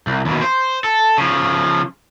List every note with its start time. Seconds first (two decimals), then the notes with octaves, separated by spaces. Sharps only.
0.07 C2
0.25 D#2 B2
0.42 C5
0.84 A4
1.18 C#3 F3